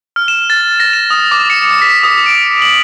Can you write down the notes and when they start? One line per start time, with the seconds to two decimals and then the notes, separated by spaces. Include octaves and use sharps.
0.16 F6
0.28 E7
0.50 A6
0.80 A#6
0.93 E7
1.10 D#6
1.31 D6
1.50 C#7
1.82 B6
2.03 D#6
2.26 D7
2.62 F#7